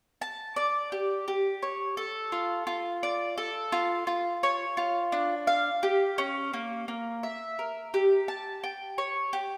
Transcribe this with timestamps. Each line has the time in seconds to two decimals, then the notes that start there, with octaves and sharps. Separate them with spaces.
0.21 A5
0.56 D5
0.92 G4
1.28 G4
1.62 C#5
1.97 A4
2.32 F4
2.67 F4
3.03 D5
3.38 A4
3.72 F4
4.07 F4
4.43 C#5
4.77 F4
5.12 D4
5.47 F5
5.83 G4
6.18 C#4
6.53 A#3
6.88 A#3
7.23 E5
7.59 A#4
7.94 G4
8.28 A5
8.64 G5
8.98 C#5
9.33 G4